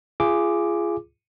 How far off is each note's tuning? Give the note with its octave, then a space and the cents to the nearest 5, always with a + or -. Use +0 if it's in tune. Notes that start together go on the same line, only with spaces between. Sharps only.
F4 -30 G#4 +0 D6 +0